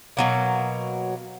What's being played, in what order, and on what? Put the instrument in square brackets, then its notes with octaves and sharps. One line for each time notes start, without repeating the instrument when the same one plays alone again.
[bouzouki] B2 F#3 A#3